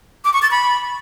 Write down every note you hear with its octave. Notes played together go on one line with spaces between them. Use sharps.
D6
C#6
A6
B5